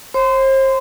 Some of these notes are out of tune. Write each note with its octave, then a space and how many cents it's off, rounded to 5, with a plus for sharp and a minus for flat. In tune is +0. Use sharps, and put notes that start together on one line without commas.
C5 +35 C6 -30